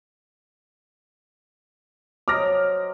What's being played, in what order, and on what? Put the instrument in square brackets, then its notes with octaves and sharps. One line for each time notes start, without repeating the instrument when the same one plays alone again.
[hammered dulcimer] F#3 C5 D#5 [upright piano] D6 F6 A#6